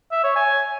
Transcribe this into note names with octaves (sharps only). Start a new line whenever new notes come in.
E5
C#5
G#5